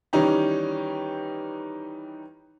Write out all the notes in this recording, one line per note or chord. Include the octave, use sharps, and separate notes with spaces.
D#3 E3 G3 C#4 D#4 G4